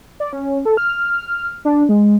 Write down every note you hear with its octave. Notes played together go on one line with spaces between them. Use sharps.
D5
C#4
A4
F6
D4
G#3